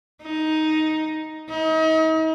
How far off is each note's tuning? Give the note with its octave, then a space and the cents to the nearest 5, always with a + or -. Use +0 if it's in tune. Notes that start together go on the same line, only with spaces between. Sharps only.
D#4 +5
D#4 +40